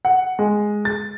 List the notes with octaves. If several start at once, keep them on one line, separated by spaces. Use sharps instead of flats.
F#5
G#3
A6